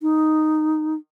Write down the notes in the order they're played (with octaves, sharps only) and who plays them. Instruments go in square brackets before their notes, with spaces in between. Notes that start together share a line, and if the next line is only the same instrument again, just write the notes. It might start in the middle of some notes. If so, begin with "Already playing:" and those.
[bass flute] D#4